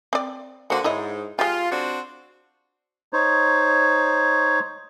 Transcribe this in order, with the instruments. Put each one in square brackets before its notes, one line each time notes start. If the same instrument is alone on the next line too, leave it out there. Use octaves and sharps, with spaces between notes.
[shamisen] C4 D5
[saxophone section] D3 F#4 [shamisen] A#3 C5
[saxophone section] G#2 [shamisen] E4 C#5 D#5
[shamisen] G#3 G4 [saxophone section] F4
[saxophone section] C4 D4 F#4
[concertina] D#4 C5 C#5